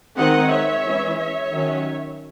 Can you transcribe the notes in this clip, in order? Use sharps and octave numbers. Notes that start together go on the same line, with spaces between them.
D#3 G#3 C4 D#5 F#5
C#5 E5
E3 G#3 C#4
C#5 E5
D#3 F#3 C#4